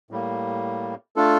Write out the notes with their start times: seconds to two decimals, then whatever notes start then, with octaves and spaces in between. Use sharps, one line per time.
0.11 A2 G3 A#3
1.16 A3 D4 F4 A4